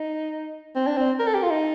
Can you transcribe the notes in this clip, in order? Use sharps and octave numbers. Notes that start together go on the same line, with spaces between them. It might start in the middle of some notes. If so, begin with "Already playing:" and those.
Already playing: D#4
C4
D4
C4
A#4
A4
G4
F4
D#4